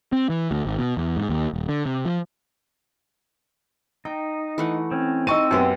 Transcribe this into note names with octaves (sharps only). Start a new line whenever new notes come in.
C4
E3
D2
G#1
B2
E2
G#2
D#2
D#1
D3
C3
F3
D#4 G5
E3 A3 F#5
C4 C#4
C4 D#4 D#5 A5 C#6 E6 D#7
F#2 F#3 B3 G4